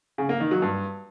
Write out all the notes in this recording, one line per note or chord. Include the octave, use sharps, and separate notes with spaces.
C#3
A#3
D#3
F#3
G2